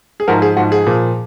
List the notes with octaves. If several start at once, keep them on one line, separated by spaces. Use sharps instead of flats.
G#4
G#2 F3 F#4 A#4
G#4
G#2 F3 F#4
G#4
A#2 F3